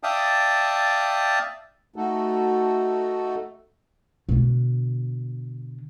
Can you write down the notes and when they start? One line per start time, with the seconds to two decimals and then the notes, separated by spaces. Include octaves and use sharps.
0.03 D5 E5 F5 G5 A5 D#6
1.96 A3 D#4 F#4 A4
4.29 B2 D3